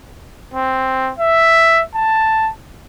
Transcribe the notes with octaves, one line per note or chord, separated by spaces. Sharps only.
C4
E5
A5